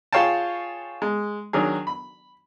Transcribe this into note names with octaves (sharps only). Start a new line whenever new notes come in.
F4 G#4 C#5 F5 G5 A5
G#3
D#3 F#3 D4 G#4
B5